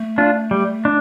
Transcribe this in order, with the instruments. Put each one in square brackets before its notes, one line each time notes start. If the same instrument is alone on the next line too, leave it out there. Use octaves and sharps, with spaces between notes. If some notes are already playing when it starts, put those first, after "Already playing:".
Already playing: [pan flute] A3
[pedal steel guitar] D4 F4
G3
D4